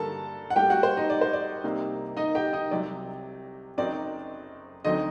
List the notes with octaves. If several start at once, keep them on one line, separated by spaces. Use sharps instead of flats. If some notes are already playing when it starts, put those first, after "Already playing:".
Already playing: G2 D3 G3 A#3 A4 A#4 A5
F#5
A2 G3 A#3 G4 G5
F#4 F#5
C5
D#4 D#5
D5
C5
D5
C2 C3 G3 A#3 D#4
D#4 D#5
G4 G5
D#4 D#5
C2 C3 F#3 C4 D5
F#1 F#2 F#3 C4 D#4 D5
D2 D3 F#3 C4 D#4 D#5